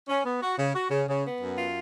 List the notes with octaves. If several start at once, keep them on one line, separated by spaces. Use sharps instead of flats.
C#4
B3
F#4
C#3
F#4
C#3
C#3
B3
F#2
F4